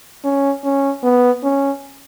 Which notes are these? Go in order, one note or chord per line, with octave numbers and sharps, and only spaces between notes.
C#4
C#4
B3
C#4